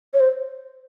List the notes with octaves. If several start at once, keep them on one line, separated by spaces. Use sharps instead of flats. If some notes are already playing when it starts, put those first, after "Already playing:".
C#5
C5